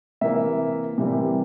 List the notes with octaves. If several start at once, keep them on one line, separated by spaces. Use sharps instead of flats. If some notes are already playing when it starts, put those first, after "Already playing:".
C3 E3 A#3 E5
C3 E3 G3 A#3